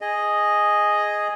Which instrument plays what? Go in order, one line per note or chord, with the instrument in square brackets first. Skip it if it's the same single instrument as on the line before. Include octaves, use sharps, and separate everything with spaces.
[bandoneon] G#4 D#5